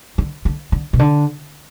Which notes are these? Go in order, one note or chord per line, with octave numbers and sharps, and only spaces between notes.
D3
D3
D3
B2
D3